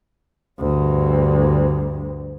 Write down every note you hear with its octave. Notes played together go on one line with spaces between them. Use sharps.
D2 G2